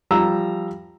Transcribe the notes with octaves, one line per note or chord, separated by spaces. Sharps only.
F3 G3 A#5 E6